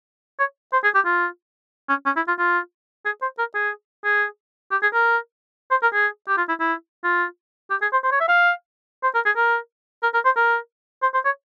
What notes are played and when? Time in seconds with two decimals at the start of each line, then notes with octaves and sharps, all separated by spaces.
0.39 C#5
0.73 C5
0.84 G#4
0.95 G4
1.06 F4
1.89 C#4
2.06 C#4
2.16 E4
2.28 F4
2.38 F4
3.05 G#4
3.22 C5
3.38 A#4
3.55 G#4
4.04 G#4
4.71 G4
4.82 G#4
4.94 A#4
5.71 C5
5.82 A#4
5.93 G#4
6.28 G4
6.37 F4
6.49 E4
6.60 E4
7.04 F4
7.70 G4
7.82 G#4
7.93 C5
8.04 C5
8.12 C#5
8.20 E5
8.28 F5
9.03 C5
9.15 A#4
9.26 G#4
9.37 A#4
10.03 A#4
10.14 A#4
10.25 C5
10.36 A#4
11.02 C5
11.14 C5
11.25 C#5